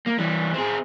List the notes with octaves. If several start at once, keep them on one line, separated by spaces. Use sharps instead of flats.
A#3
E3 G3
C4 G#4